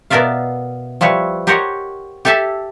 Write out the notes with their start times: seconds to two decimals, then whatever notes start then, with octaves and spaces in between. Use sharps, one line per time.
0.10 B2 B3 A#4 D5 E5 F5
1.01 F3 G3 E4 B4 C#5
1.47 G4 A#4 C5 C#5 D#5 F#5
2.25 G4 A4 E5 G#5 A5